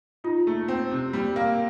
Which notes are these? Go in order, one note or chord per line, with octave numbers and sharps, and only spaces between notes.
D#4 F4
A3
C4
C3
G3
A#3